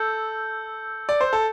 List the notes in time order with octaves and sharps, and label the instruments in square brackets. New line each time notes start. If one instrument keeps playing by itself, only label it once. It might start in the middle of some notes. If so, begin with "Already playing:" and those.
Already playing: [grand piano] A4 [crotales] E6 G6
[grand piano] D5
C5
A4